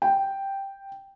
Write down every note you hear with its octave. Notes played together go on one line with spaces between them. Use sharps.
G5